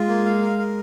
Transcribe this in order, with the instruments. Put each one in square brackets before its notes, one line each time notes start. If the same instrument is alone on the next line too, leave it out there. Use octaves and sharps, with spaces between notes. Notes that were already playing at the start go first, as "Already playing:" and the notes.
Already playing: [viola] G#3 [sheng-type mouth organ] F4
[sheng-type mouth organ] A#3
F5
A#4
A#4